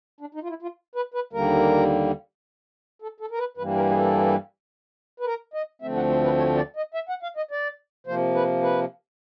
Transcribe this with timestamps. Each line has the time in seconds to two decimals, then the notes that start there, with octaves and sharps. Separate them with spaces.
0.20 D4
0.34 D#4
0.43 F4
0.49 E4
0.62 F4
0.95 B4
1.14 B4
1.33 D#2 D3 G3 A#3 A#4
3.02 A4
3.20 A4
3.31 A#4
3.39 B4
3.57 G2 E3 G3 A#3 B4
3.76 A#4
3.90 G#4
3.94 A4
5.20 B4
5.26 A#4
5.54 D#5
5.81 D2 D3 F3 A3 C4 E5
5.96 F#5
6.10 C5
6.24 B4
6.38 C#5
6.56 D5
6.76 D#5
6.94 E5
7.09 F#5
7.23 F5
7.37 D#5
7.51 D5
8.07 C3 F3 A#3 C5
8.35 B4
8.62 B4